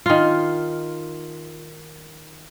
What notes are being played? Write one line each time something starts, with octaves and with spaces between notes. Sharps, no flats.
D#3 F4